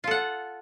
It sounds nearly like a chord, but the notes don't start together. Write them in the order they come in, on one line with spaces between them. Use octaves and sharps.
F4 A4 F#5